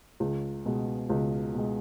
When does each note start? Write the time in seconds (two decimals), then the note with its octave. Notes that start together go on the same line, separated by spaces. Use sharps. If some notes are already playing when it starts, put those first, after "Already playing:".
0.20 C#2
0.66 B2 G#3
1.10 C#2
1.54 B2 G#3